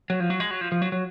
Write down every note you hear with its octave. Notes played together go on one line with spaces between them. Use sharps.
F#3
F3
F#3
G#3
F#3
F3
F3
F#3
F#3